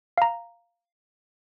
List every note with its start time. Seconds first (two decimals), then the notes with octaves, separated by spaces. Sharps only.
0.18 F5 A#5